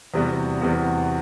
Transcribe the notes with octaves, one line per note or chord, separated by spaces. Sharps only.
E2 C3 G3 B3 F#4
E2 C3 G3 B3 F#4